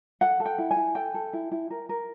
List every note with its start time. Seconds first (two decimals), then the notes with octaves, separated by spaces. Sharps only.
0.21 A4 F#5
0.40 A4
0.46 G5
0.58 E4
0.71 G#5
0.76 E4
0.95 A4 G5
1.14 A4
1.33 E4
1.52 E4
1.70 A#4
1.89 A#4